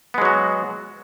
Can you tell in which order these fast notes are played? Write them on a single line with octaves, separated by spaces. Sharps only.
B3 G#3 F#3 F#4